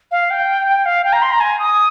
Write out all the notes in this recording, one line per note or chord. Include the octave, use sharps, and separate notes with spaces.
F5
G5
G5
F5
G5
A#5
C6
A#5
G#5
D#6